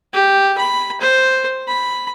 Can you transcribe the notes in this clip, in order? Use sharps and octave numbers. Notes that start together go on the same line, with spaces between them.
G4
B5
C5
B5